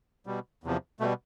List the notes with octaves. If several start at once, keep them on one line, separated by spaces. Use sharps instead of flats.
B2 G3
E2 C3 F3
B2 G3 A3